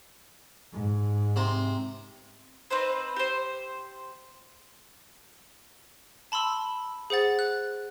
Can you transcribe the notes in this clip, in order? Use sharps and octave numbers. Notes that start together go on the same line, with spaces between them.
G#2
C3 C5 A#5
C4 D#4 B4 C5
G4 C5
A5 B5 C6 E6
G#4 C5 F#5 A6
F#6